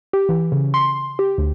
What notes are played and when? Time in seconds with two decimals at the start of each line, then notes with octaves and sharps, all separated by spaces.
0.13 G4
0.29 E3
0.52 C#3
0.74 C6
1.19 G4
1.38 D2